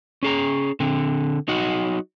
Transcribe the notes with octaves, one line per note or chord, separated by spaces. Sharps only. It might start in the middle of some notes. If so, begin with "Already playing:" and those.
C#4 G#4 A#5
D3 C4
F#3 D#4 F#4 F#5